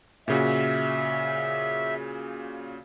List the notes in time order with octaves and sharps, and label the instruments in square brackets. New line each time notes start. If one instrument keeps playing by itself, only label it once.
[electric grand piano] A#2 C#3 F#4 [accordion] E5